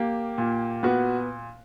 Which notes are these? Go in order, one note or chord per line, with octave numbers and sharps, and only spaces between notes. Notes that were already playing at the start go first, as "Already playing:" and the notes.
Already playing: A#3 G4
A#2
B3 F#4